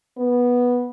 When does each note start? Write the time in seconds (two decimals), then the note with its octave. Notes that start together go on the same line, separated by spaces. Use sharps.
0.17 B3